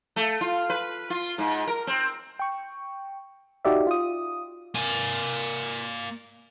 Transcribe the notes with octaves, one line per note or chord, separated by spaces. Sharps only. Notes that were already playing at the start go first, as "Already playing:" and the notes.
A3
F4
B4
F4
G#2
A#4
C4
G5 C#6
D#4 F#4 G4 D5 E5
F4 D#6
A#3 G#5